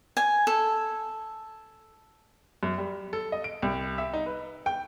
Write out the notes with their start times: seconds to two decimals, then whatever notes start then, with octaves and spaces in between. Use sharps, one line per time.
0.17 G#5
0.47 A4
2.63 F#2
2.78 G3
3.13 A4
3.32 D#5
3.44 D7
3.62 C2
3.98 E5
4.14 D#4
4.26 B4
4.66 G5